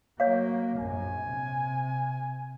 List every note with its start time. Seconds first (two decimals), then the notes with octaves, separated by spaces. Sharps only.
0.20 F#3 A#3 C#5 F5
0.78 A#1 F#2 G#5
1.23 C3